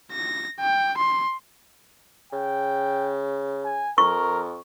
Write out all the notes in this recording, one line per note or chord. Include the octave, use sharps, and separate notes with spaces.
A#6
G5
C6
C#3 G5
G#5
F2 A#4 C#6